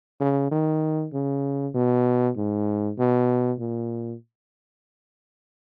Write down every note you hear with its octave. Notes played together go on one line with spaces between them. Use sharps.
C#3
D#3
C#3
B2
G#2
B2
A#2